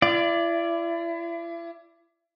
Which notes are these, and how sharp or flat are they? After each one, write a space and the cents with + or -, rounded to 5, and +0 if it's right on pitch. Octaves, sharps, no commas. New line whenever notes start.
E4 +40 D5 +0